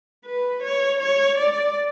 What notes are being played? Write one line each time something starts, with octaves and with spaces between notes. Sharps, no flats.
B4
C#5
C#5
D5